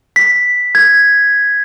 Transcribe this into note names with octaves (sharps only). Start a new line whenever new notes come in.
B6
G#6